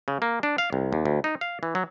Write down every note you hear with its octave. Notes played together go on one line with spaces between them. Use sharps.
C#3
A#3
D4
F5
C2
D#2
D2
D#4
F5
E3
F#3